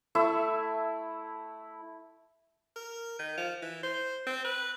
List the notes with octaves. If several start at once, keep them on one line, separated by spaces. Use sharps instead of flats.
A3 E4 E6
A#4
D#3
F3
E3
C5
C4
B4